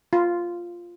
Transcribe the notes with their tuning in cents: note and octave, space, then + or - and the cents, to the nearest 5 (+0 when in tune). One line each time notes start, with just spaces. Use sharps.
F4 +0